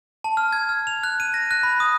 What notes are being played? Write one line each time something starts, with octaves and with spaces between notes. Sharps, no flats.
A5
F6
G#6
F6
F7
F#6
D#7
A#6
F#6
B5
D#6